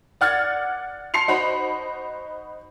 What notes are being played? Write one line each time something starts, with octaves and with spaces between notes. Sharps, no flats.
D5 F#5 F6 G#6 A6
A5 C6 C7 C#7 F7
D#4 F#4 C5 B5